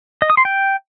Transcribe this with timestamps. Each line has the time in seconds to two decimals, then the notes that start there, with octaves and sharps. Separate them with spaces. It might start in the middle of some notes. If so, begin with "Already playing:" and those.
0.22 D#5
0.30 D#6
0.37 C6
0.45 G5